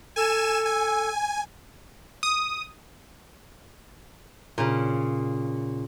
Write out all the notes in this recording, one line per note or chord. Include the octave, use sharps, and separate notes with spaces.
A4 G#5 E7
G#5
D#6
A#2 C#3